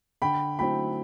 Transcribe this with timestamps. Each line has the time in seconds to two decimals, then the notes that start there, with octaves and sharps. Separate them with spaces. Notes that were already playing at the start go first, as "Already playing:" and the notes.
0.22 D3 G5 B5
0.59 F#3 A3 C4 E4 G5 B5